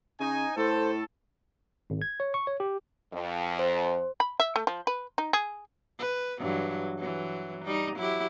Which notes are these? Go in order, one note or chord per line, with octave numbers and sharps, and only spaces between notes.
C#3 D#4 G#5
A2 A4 C5
G#1
G#6
C#5
C#6
C#5
G4
F2
C5
B5
E5
A3
F3
B4
D#4
G#4
B4
G2 E3 F#3
E3 F#3
G3 D#4
F#3 E4 G4